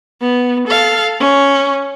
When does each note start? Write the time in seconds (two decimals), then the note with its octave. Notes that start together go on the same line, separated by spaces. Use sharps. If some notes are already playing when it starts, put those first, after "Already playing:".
0.21 B3
0.67 A4 F5
1.20 C#4